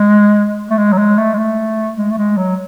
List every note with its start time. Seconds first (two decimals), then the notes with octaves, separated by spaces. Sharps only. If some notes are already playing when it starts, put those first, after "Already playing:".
Already playing: G#3
0.70 A3
0.78 G#3
0.92 F#3
0.98 G#3
1.18 A3
1.34 G#3
1.38 A3
1.97 G#3
2.10 A3
2.18 G#3
2.37 F#3